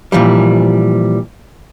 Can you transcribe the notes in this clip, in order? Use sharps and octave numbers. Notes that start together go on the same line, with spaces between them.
A#2 E3 F3 G3